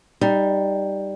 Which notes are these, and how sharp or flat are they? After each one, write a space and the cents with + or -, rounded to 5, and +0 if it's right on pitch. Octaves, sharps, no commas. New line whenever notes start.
G3 +0 D#4 -15